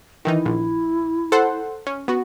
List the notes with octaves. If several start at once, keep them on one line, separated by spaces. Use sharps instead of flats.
D#3 E3 D#4 E4
A#1
A4 C5 F#5
C#4
B3 F#4